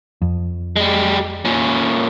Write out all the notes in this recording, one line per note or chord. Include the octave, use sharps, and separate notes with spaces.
F2
G3 G#3
A#2 C#4